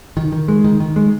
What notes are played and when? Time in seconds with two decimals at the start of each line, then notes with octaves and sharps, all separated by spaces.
0.17 D#3
0.32 D#3
0.48 G#3
0.64 D#3
0.80 D#3
0.96 G#3